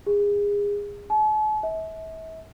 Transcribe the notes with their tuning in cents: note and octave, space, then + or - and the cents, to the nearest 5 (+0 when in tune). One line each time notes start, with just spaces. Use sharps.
G#4 -30
A5 -45
E5 -35